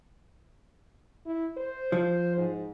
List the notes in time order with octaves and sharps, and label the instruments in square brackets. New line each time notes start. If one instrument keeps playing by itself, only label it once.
[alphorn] E4
C5
[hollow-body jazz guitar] F3
[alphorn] G#2